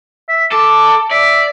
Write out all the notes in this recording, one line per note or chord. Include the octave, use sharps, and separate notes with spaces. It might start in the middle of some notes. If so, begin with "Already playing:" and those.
E5
A4 D6
D5 E5